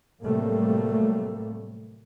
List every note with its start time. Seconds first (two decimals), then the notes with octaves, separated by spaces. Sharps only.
0.21 A2 C3 F#3 G3 A3 A#3